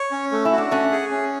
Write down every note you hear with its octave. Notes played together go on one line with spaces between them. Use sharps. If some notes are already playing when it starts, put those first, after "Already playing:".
Already playing: C#5
C#4
A3
E4
F#4
D4
A3 C#4 F#5
G#4
C#4